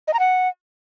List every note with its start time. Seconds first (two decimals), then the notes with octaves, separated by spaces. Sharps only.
0.08 D#5
0.14 A#5
0.19 F#5